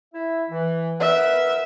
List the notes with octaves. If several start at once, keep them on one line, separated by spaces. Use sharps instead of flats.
E4 E5
E3
B3 A#4 B4 E5